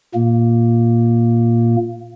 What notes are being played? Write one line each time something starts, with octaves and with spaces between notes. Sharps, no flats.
A#2 A#3